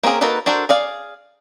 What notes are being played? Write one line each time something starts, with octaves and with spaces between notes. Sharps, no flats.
A#3 C4 C#4 G#4 A#4
A#3 D#4 F#4 A4 B4
D4 F#4 A4 A#4 C5
G#4 D5 F5